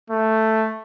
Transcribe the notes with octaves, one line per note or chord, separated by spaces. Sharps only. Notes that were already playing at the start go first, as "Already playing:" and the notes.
A3